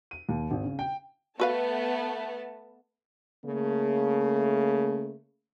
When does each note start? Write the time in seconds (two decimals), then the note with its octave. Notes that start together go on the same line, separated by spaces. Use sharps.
0.11 D#7
0.29 D#2
0.51 G#1
0.64 C#3
0.79 G5
1.40 A3 B3 F#4 B4 F5 A5
3.46 C#3 A3 A#3